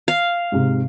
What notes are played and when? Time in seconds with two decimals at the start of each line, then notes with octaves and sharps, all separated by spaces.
0.08 F5
0.52 G#2 C3